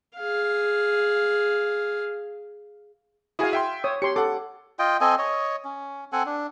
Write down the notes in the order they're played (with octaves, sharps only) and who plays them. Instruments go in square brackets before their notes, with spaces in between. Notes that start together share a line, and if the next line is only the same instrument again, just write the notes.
[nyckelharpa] G#4 F5
[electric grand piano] E4 F#4 G#4 [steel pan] F5 G#5 D#6
[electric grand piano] E5 G5 C6
[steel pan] C#5 D#6
[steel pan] G4 C#5 C6 [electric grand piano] C#7
[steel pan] A4 [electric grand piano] F#5 D6
[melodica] F4 D#5 G5
C4 A4 D#5 G#5
C#5 D#5
C#4
C4 A4 F#5 G#5
D4